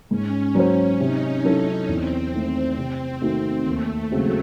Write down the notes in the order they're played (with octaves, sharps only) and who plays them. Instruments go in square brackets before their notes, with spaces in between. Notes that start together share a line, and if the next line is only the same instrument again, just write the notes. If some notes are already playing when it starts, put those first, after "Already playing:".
[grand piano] G#2 [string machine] C#4
[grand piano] F#3 C#4 F#4 C5
[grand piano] C3 [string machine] D#4
[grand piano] F#3 C#4 E4 A4
[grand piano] E2 [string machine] C4
[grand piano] D#3 A3
C3
D#3 A3 D#4 F#4
[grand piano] D#2 [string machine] A3
[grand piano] C#3 G#3 C4 F#4 [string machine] F#3